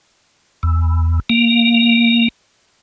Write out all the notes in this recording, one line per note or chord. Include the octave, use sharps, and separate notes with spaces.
E2
A#3